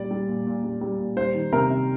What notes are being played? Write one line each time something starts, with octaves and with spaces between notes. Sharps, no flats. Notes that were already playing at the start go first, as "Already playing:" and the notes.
Already playing: A#2 G3 D5
G3
A#2
A#2
G3
G3
A#2
G3 C5
D#3
C3 A#4
C3